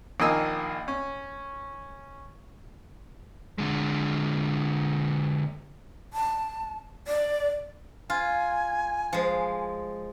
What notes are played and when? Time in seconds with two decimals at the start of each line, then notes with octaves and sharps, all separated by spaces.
0.20 A#1 D#3 A#3 D#5 G#5 E6
0.88 C#4
3.58 D3 G#3
6.13 A5
7.08 D5
8.10 F4 G#5
9.13 F3 G#3